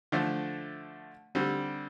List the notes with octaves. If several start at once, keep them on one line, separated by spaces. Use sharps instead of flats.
D3 F3 A3
D3 G3 C4